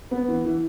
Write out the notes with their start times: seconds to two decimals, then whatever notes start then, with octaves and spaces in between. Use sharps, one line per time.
0.11 B3
0.28 E3
0.45 E3